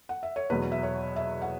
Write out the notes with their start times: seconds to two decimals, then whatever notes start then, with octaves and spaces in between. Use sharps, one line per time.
0.09 F#5
0.23 E5
0.36 C#5
0.50 E2 B2 F#3 B4
0.72 E5
0.83 C#5
1.16 E5
1.42 F#5